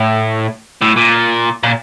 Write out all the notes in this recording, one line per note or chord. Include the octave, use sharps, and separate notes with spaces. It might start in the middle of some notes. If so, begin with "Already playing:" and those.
Already playing: A2
A2
A#2
A#2